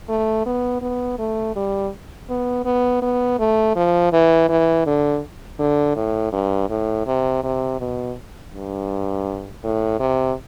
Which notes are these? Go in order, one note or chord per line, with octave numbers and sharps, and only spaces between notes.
A3
B3
B3
A3
G3
B3
B3
B3
A3
F3
E3
E3
D3
D3
A2
G2
A2
C3
C3
B2
G2
A2
C3